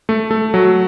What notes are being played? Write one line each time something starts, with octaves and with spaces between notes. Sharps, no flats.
A3
A3
F#3